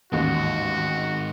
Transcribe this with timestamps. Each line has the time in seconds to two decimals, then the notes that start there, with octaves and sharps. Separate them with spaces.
0.12 A1 D#2 G#2 D#3 F#4